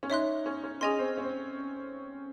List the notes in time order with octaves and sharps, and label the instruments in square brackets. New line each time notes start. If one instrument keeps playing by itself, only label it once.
[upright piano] C#4
[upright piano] D#4 [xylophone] C#5 E5 C6 F#6
[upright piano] C#4
C#4
[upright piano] C#4 [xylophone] G#4 D#5 G#5 C6
[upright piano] C4
C#4
C4